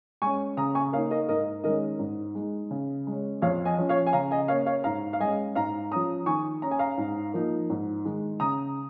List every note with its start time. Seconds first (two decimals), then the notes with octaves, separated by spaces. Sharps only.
0.22 G#3 C#4 G#5 C#6
0.57 C#3 A#5 D#6
0.75 G#5 C#6
0.92 A#3 C#5 F5
0.96 D#4
1.11 A#4 D#5
1.29 G#2 A#4 D#5
1.64 D#3 G#3 C#4 A#4 D#5
1.99 G#2
2.35 G#3 D#4
2.71 C#3
3.07 G#3 C#4
3.42 F2 C#5 F5
3.65 D#5 G#5
3.78 F3 C#4
3.89 C#5 F5
4.07 G#5
4.13 C#3 F5 A#5
4.31 D#5 G#5
4.48 A#3 C#4 C#5 F5
4.66 C#5 F5
4.84 G#2 F5 A#5
5.13 F5
5.20 G#3 C#4 D#5 G#5
5.55 G#2 F5 A#5
5.92 F3 C#4 A#5 D#6
6.26 D#3 G#5 C#6
6.62 C#4 A#5
6.71 G#5
6.79 F5 A#5
6.98 G#2
7.34 F3 A#3 D#4
7.70 G#2
8.05 D#3 G#3 D#4
8.40 C#3 A#5 D#6